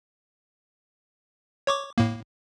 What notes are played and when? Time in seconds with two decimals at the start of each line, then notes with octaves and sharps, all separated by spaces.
1.67 C#5 C#6 D6
1.98 A2 A#3